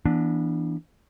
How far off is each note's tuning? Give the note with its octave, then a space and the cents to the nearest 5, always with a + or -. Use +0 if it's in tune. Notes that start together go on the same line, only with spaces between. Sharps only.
E3 +0 B3 -35 D4 +0